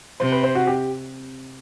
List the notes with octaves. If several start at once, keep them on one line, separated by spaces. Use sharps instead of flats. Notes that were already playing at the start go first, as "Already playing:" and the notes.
C3 C5
B4
C5
F#4
G4